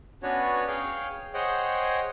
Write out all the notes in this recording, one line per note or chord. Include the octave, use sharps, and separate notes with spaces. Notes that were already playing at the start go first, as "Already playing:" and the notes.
B3 C#4 D4 F#4 B4 C#5
G#4 C#5 F5 G5
G#4 C5 C#5 D#5 F#5 G5